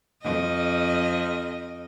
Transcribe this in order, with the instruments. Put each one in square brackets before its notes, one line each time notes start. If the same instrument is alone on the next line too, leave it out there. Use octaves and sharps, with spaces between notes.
[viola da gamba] F2 D#5